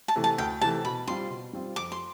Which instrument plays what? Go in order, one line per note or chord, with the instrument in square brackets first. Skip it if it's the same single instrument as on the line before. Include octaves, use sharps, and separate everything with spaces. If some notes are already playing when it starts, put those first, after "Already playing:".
[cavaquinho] A5
[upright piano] C3 E3 A3
[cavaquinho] A5
[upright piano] D2 [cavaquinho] G5
[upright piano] C3 E3 A3 [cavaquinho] A5
[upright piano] B2 [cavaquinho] B5
[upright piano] G3 C4 F4 [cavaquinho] C6
[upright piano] B2
G3 C4 F4
[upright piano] F2 [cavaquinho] D6
[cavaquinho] C6